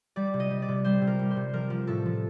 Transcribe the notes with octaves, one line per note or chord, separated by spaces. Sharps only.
G3 D5
C3
D#5
G3
D5
C3
G3 C5
C3
A#4
G3
C5
C3
F3 A#4
F3
A2 A4
F3